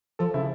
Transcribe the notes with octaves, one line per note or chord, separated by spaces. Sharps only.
F3 A4
C#3 E4